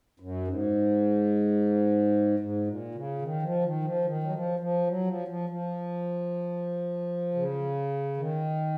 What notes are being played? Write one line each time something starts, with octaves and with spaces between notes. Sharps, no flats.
F#2
G#2
G#2
A#2
C#3
D#3
F3
D#3
F3
D#3
F#3
F3
F3
F#3
F3
F3
F3
C#3
D#3